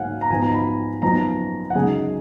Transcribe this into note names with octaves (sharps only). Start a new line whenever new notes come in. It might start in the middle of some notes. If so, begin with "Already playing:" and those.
Already playing: G#2 F#3 A#3 C#4 F5 F#5 G#5
A#5
G#2 F3 B3 D#4 G#5
A#5
B5
F#2 F3 B3 D#4 A#5
F#5
F#2 C#3 G#3 D#4 G#5